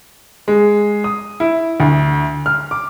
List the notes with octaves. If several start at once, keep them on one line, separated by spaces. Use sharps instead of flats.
G#3
D#6
E4
D2
F6
D6